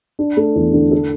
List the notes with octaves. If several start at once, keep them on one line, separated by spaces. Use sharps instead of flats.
D4
A3
E2
D3
A4